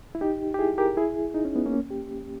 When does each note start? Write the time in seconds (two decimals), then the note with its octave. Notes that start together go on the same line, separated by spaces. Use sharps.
0.15 E4
0.21 D#4 G4
0.54 G4
0.59 E4 G#4
0.78 G4 A#4
0.97 E4 G#4
1.34 D#4
1.45 C#4
1.56 B3
1.66 A#3 C#4
1.91 G4